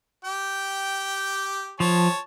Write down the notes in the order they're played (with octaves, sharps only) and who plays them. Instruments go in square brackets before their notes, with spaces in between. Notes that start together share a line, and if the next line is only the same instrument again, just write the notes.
[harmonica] G4 G5
[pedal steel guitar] F3 [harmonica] C#5 A5